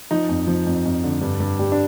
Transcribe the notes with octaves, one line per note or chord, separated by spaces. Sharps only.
F3 D#4
F2
F3
F2
F2
D3
G2
G2
G3
D4